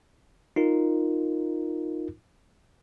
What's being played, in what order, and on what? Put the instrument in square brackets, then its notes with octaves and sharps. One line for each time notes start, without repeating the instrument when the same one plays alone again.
[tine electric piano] D#4 F4 A#4